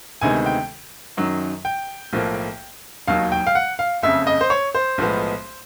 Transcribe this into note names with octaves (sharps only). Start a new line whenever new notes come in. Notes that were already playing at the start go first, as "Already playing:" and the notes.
D2 C3 D#3 G#3 B3 G#5
G5
F#2 D#3 F#3
G5
B1 A2 F3 A#3
E1 D#2 D#3 F#3 F5
G5
F5
F#5
F5
F#1 F2 C#3 E5
D#5
C5
C#5
C5
B1 A2 F3 G#3 B3